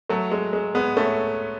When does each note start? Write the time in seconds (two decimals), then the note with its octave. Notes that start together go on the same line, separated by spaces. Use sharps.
0.09 F#3 A3
0.32 G#3
0.53 G#3
0.75 G#3 B3
0.97 A3 C#4